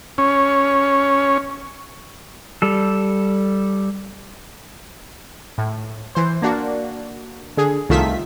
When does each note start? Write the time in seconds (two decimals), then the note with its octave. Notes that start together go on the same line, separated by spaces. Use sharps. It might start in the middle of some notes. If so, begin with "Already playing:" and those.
0.18 C#4
2.62 G3 A4
5.58 A2
6.15 E3 C5
6.42 A#3 D4 F#4
7.57 D3 G#4
7.89 C2 D#3 A3 F4 E5 B6